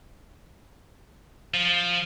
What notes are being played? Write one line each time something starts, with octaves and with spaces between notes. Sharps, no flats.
F3